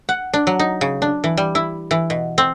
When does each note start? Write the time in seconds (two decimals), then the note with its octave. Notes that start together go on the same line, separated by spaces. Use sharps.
0.09 F#5
0.34 D4
0.47 F#3
0.59 D#4
0.81 C#3
1.02 D4
1.24 E3
1.37 G3
1.55 E4
1.91 E3
2.10 B2
2.38 C4